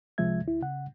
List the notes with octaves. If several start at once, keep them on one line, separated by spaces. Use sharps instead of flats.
C2 C3 F3 G#3 E5 G#6
D2 E4
C#3 F#5